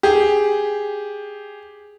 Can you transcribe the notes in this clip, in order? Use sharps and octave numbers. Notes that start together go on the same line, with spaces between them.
G4 G#4